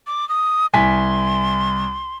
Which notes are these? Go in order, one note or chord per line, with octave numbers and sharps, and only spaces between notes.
D6
D#6
C2 G#5 C6 B6